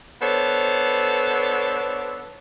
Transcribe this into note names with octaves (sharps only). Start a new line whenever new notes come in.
B3 D4 A4 C5 C#5